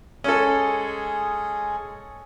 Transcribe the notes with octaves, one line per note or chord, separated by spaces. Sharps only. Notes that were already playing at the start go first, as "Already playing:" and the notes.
G#3 C#4 G#4 A4